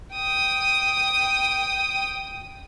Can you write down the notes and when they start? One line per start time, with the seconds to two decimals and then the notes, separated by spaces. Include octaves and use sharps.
0.15 G5 D#6